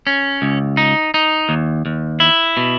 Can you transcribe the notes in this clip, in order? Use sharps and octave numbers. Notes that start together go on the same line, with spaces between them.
C#4
C#2
D#4
D#4
D#2
D#2
E4
B2